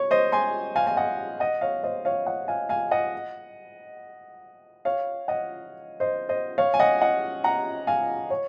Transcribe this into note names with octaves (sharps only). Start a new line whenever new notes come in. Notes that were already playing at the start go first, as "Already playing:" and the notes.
Already playing: C#5
C5 D#5
G#5 C6
F5 G#5
G#5
D#5 F#5
D#5 F#5
C#5 F5
C5 D#5
C#5 F5
D#5 F#5
F5 G#5
F5 G#5
D#5 F#5
C#5 F5
D#5 F#5
C5 D#5
C5 D#5
C#5 F5
G#5
D#5 F#5
D#5 F#5
F#5 A#5
F5 G#5
C#5